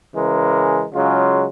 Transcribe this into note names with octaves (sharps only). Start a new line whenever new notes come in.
C#3 E3 G#3 A#4
C#3 F#3 G#3 F4